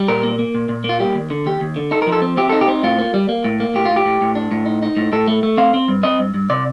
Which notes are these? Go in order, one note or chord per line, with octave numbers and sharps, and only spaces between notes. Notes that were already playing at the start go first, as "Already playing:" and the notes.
Already playing: G3
A#2 A#4
A#3
A#3
A#2
A#2
A#3
F4
G3 G4
D#2
D3
D#2 G4
D#2
D3
D#4 A4
F3 A#4
A4
C4
C4 G4
D#4 A4
G4
C4
A2 F4
A#3
G3
A#3
A2
A#3
A2 G4
A2 F4
G4
A2
A2
D4
A2
D#4
D#4
A2
A2 A4
A3
A3
C4 F5
C4
G2
C4 D#5
G2
G2
C3 D5